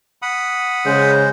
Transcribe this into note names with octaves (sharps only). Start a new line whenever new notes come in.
F#5 B5 D#6
C#3 G#3 C5